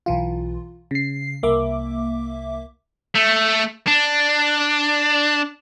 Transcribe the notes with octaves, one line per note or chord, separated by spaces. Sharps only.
B1 E3 F4
C#3 C7
C2 A#3 E5 D6
A3
D4